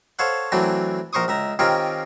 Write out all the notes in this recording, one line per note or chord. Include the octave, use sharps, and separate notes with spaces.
A4 C5 C#5 F5 F#5
E3 F#3 A3 C4 D4
A#1 A#4 C5 C#6 D#6
C#2 E5 A#5
D#3 C4 C#4 F4 G4 A#4